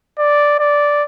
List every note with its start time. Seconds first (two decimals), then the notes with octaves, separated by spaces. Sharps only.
0.19 D5
0.59 D5